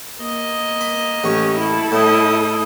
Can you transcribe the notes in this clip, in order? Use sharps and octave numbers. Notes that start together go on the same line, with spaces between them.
A#3 D#5
B5
A1 C#4 G4 C#6
E4 A4
A2 D#5 D#6